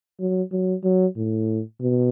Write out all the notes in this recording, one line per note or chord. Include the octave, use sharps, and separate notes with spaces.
F#3
F#3
F#3
A2
B2